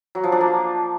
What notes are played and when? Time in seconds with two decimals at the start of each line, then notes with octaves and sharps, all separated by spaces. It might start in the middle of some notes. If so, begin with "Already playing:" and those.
0.15 F#3
0.24 F3
0.32 D4
0.41 A#3